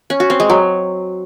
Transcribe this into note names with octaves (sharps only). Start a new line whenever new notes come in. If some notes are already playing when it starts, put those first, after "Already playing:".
C#4
F#4
C4
G#3
F#3